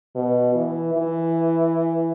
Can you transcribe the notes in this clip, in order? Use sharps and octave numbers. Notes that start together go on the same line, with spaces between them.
B2
E3
E3